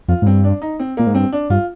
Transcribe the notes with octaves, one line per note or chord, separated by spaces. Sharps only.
F2 F4
G#2
G2 C4
D4
D#4
C4
A#2 A#3
G#2
G2 C4
D4
G2 F4